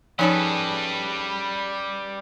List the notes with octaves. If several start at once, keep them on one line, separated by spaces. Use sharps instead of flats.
F3 G3 C#4 D#4 G#4 A4 B4 C#5